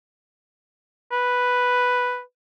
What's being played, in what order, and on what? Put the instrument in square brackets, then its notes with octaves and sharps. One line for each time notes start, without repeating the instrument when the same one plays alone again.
[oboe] B4